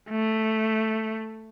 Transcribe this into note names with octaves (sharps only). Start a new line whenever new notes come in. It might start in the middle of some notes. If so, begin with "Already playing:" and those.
A3